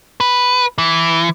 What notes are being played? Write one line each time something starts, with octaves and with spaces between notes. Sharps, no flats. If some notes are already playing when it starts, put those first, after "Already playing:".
B4
E3